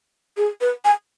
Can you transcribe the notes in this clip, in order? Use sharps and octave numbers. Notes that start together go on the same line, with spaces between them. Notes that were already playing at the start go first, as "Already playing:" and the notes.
G#4
B4
G#5